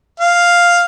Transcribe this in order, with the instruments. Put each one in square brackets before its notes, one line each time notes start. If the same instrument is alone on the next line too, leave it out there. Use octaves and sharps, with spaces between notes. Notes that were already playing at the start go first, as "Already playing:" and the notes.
[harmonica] F5